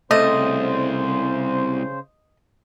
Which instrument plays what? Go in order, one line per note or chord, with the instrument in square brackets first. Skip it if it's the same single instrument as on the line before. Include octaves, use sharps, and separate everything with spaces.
[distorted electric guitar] C2 [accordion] C#3 C5 [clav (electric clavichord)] A3 [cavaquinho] D#5